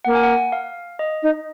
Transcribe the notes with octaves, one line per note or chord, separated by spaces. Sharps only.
A#3 F#5
G#5
F#5
F5
D#5
D#4